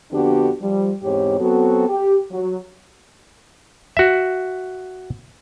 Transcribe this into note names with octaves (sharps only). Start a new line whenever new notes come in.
F2 D3 B3 D4 F#4 G4
F3 G3
E2 G#2 C4 G4 C#5
F#3 B3 C4 F#4 A4
G4
F#3
F#4 E5